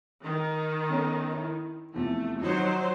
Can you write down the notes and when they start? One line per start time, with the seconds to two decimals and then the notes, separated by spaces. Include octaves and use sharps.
0.24 D#3
0.90 B3 C#4 A4
1.33 E4
1.94 E2 C3 F3 A3
2.40 D#3 F3 F#3 D#4 C5